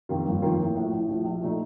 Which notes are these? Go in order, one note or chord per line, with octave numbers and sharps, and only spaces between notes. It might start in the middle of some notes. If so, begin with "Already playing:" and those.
F2 D#3 A#3 F4
G1
F2 D#3 A#3 F4
A1
A2 F3
A1
A2 F3
A#1
A#2 A3 D#4